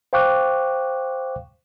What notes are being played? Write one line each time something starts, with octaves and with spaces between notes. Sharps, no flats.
C5 F5 G5 C#6 D6 F#6